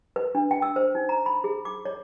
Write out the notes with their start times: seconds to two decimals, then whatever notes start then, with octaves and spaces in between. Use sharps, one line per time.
0.16 B4
0.35 D4
0.51 G5
0.62 E6
0.76 C5
0.95 D#4
1.09 A#5
1.26 B5
1.44 G#4
1.65 D6
1.85 C#5